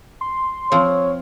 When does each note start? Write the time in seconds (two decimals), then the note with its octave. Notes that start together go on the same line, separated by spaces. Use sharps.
0.21 C6
0.72 F3 C4 C#5